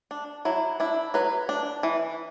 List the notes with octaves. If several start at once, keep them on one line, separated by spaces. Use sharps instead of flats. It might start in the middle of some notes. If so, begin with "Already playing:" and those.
D4
F#3 E4
D4 E4
F#3 B4
D4
E3